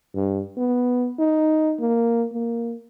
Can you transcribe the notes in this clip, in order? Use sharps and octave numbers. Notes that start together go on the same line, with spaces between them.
G2
B3
D#4
A#3
A#3